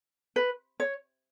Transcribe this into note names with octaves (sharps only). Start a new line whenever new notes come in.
B4
C#5